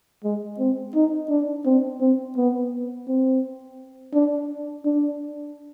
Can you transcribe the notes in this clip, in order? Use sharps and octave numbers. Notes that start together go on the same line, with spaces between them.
G#3
C4
D#4
D4
C4
C4
B3
C4
D4
D4